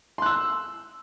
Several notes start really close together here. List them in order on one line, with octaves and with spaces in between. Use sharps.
C6 F#6 E6